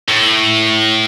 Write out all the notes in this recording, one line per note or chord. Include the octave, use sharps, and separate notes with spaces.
A2